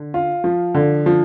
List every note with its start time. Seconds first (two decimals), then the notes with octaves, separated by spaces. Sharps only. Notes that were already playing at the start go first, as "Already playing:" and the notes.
Already playing: D3
0.14 F4
0.44 F3
0.74 D3
1.06 F3